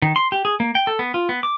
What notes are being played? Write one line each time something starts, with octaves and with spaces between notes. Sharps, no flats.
D#3
C6
G4
G#4
A#3
G5
A4
B3
F4
B3
D6